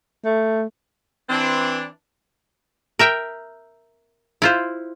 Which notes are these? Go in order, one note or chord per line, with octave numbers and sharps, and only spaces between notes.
A3
E3 C4 D4
A#4 E5 G5
E4 F4 C5